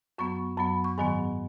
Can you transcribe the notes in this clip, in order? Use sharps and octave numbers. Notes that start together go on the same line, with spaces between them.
F#2 F#3 B3 C#6
F#2 F#3 B3 B5
C#6
G#2 D#3 F#3 B3 G#5